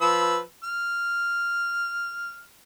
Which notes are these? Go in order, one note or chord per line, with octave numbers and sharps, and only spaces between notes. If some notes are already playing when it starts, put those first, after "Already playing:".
F3 B4 E6
F6